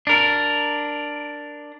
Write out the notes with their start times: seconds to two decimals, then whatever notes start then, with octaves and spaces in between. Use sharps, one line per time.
0.07 D4 A#4